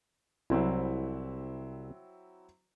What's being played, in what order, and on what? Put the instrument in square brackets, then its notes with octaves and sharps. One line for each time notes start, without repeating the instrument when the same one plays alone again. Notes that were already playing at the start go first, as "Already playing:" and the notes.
[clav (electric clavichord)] C2 [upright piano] F#3 C4 E4